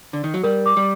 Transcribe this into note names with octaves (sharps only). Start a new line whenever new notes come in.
D3
D#3
F#3
G3 A#4
D6
G3